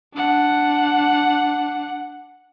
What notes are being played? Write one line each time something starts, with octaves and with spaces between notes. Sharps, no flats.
D4 F#5